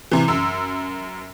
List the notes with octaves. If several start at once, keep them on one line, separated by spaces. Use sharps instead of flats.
C3 E3
F#2 E6